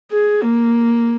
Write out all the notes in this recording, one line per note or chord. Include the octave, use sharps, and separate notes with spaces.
G#4
A#3